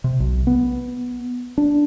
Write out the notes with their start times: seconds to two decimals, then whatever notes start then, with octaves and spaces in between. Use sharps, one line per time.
0.04 C3
0.20 B1
0.47 B3
1.58 D4